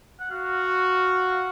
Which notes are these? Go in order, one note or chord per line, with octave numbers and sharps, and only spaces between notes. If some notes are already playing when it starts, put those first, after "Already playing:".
F#5
F#4 F5
F5